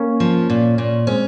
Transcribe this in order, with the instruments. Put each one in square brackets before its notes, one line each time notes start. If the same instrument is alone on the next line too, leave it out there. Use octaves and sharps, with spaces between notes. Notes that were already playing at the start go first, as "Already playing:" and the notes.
Already playing: [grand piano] A#3 C#4
[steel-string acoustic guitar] F3
A#2
A#2
[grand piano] G#3 C4 [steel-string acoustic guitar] C#4